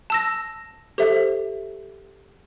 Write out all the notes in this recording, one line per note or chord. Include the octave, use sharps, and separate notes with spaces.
A5 E6 A#6
G4 A4 C5 E5